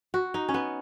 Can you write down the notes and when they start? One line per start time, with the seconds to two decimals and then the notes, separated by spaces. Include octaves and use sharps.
0.14 F#4
0.34 D#4
0.49 C#4
0.54 B3